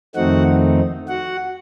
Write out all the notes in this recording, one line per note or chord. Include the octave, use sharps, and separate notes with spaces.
F2 D#3 A3 C4 D#4 F#4 F#5
F#4 F#5